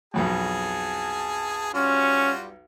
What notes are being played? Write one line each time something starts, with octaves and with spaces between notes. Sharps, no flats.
B1 F2 F#3 G#4 G#5 A5
G3 C#4 F4 F#4